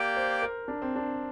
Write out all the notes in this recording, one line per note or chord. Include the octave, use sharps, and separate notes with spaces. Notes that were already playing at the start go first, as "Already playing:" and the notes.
Already playing: A#3 G4 D5 G5
C5
A#4
D4
C4
D4